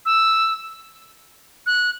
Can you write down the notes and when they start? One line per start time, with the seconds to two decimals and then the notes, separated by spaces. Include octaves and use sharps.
0.06 E6
1.66 F#6